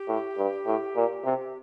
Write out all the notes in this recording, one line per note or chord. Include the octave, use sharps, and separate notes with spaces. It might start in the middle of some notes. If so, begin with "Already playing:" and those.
Already playing: G4
A2
G2
A2
A#2
C3